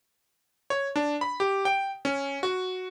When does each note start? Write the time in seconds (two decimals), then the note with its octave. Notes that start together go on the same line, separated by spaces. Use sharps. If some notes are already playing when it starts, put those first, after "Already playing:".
0.70 C#5
0.96 D4
1.21 B5
1.40 G4
1.65 G5
2.05 C#4
2.43 F#4